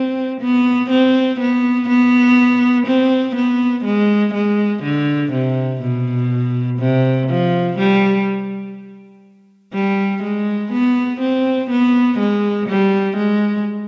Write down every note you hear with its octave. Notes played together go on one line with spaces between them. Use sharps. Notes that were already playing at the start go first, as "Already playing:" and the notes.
Already playing: C4
B3
C4
B3
B3
C4
B3
G#3
G#3
D3
C3
B2
C3
F3
G3
G3
G#3
B3
C4
B3
G#3
G3
G#3